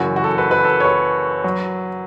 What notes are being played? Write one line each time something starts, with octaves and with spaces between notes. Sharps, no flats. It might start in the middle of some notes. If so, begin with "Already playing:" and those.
Already playing: F#1 F#2 E3 F#4
F#4
A4
B4
B4
A4
C#5
B4
F#3